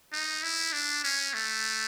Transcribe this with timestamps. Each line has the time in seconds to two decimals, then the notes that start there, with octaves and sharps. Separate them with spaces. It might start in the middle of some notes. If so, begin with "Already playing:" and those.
0.13 D#4
0.43 E4
0.73 D4
1.04 C#4
1.34 A3